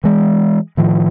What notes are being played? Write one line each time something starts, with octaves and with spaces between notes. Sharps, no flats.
E3 G#3
A2 D#3 F3